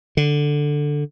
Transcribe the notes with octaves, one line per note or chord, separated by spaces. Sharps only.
D3